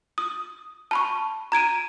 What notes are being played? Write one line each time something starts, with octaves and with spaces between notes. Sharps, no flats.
D#6
A5 B5 C#6
A#5 G#6 D7 D#7